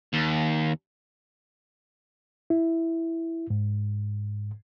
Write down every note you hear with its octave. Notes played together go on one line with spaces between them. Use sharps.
D#2
E4
G#2